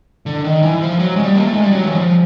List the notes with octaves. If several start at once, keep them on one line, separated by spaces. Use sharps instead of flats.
D3
D#3
E3
F3
F#3
G#3
G3
A#3
A3
G#3
G3
F#3
E3
F3